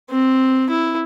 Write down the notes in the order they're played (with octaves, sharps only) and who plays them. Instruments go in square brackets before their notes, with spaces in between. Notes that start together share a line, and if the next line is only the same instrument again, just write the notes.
[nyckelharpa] C4
E4